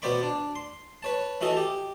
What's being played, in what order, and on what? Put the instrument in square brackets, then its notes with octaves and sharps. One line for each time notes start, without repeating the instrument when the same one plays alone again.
[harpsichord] B2 B3 C5 D5 B5 C#6
D4
C6
B4 C#5 A5
E3 F#4 A4 D#5
G4